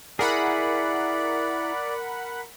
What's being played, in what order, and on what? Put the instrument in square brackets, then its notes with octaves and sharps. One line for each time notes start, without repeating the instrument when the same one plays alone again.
[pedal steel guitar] E4 G#4 [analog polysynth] A#4 F#5 B5 [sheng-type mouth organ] D5